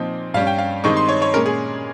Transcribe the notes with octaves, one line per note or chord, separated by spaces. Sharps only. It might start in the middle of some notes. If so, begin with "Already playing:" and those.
Already playing: A#2 F3 C4 D#4
G2 G3 C#4 F5
G5
F5
G2 D#3 G#3 C4 D#4 C#6
C6
C#5
C#5
A#2 G#3 C#4 A#4
G#4